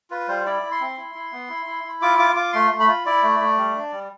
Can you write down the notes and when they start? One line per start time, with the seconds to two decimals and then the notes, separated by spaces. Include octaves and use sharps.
0.10 F4 B4
0.28 G3 C5
0.46 E4 D5
0.63 E4
0.71 C6
0.80 C4
0.97 E4
1.15 E4
1.32 B3
1.49 E4
1.66 E4
1.84 E4
2.02 F4 D6
2.18 F4 D6
2.36 F4 D6
2.53 A3 C6
2.71 A3
2.80 B5
2.88 F4
3.06 E4 D5
3.23 A3
3.40 A3
3.58 G3
3.75 D4
3.92 G3